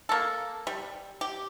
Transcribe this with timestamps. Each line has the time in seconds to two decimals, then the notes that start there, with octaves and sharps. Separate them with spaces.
0.09 A#3 A4
0.67 G3
1.21 G4